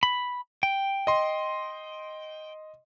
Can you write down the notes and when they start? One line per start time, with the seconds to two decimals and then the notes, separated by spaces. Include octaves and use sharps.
0.03 B5
0.63 G5
1.07 D#5 C6